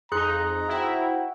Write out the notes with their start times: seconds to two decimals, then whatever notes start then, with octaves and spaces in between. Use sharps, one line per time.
0.12 F2 D#4 G#4 A#5 C6 F#6
0.68 E4 F#4 C5 G5